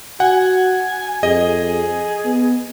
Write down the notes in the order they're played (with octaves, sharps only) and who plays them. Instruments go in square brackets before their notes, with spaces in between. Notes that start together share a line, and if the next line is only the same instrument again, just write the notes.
[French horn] F#4 [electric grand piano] F#5 [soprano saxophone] G#5
[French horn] F2 [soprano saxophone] G#4 [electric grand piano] D#5
[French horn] B3